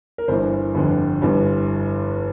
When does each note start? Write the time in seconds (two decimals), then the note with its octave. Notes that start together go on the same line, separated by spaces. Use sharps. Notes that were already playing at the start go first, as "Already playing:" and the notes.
0.18 A#4
0.28 G1 G2 E3 C5
0.75 G1 F2 D3
1.21 G1 G2 E3